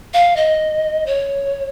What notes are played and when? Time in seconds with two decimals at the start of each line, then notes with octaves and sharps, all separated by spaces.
0.14 F5
0.36 D#5
1.06 C#5